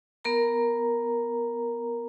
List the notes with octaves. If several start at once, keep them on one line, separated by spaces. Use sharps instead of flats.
B3 A#4 A#5